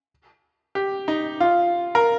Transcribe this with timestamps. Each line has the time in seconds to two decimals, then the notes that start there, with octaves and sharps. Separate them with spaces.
0.75 G4
1.08 D#4
1.40 F4
1.95 A#4